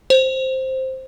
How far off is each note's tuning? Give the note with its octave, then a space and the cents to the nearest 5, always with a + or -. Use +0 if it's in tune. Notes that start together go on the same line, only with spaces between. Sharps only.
C5 +5